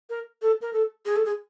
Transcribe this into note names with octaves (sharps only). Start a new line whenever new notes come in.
A#4
A4
A#4
A4
G#4
A4
G#4